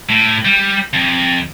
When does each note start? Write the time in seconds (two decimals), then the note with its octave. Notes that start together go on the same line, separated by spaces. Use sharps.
0.09 A2
0.45 G3
0.93 F2